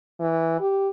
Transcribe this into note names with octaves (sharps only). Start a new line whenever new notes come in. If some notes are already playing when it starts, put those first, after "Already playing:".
E3
G4